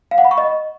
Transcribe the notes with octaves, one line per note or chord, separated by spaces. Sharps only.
F5
F#5
B5
C#6
D#5